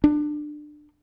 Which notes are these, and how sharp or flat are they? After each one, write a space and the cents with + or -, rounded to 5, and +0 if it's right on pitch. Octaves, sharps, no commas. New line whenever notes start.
D4 +25